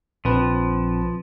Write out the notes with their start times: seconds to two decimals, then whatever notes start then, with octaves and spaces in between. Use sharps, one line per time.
0.25 A#1 F3 C4 B4